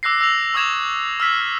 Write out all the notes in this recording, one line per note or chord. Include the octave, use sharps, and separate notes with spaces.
D6 E6 F#6 A#6 C7
E6 A#6 F7
C#6 D#6 E6 G#6 E7 F7
E6 F6 B6